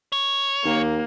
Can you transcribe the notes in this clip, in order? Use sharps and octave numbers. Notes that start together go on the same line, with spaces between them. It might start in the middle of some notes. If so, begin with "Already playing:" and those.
C#5
D#2 A#3